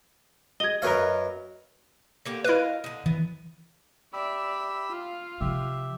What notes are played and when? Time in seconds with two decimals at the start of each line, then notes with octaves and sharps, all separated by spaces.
0.60 G#4 D#5 G#6 G7
0.82 F#2 A#4 B4 C#5 D#5 F5
2.25 D3 A#3 G4
2.44 E4 A#4 B4 D#5 F5
2.84 D3 D#4
3.06 E3 B3
4.13 G4 D5 E5 B5 E6
4.91 F4 F5
5.41 C3 F3 G4 E5